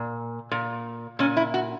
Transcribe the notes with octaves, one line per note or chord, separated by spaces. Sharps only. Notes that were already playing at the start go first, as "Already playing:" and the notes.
Already playing: A#2
A#2
A#2 C#4
E4
F#4